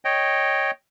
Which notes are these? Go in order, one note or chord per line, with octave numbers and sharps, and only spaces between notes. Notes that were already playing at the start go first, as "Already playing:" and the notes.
C#5 D#5 G5